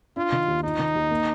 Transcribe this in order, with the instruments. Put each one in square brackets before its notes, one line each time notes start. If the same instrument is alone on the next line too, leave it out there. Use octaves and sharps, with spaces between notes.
[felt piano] D4 [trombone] F4
[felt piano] D#3
D#2
[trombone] D#4 [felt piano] F4
[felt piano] D#3
D#2
A#3